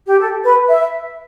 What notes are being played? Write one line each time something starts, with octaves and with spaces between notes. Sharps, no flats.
G4
A4
B4
E5